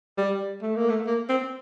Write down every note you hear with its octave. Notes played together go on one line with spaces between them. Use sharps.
G3
A3
A#3
A3
A#3
C4